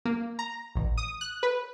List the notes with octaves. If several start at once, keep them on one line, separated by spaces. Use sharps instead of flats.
A#3
A#5
A1
D#6
F#6
B4